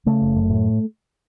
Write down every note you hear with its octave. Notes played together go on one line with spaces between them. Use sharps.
C#3 A3
F#1
F#2
A2